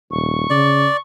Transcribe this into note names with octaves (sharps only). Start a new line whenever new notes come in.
D#1 C#6
C#3 D5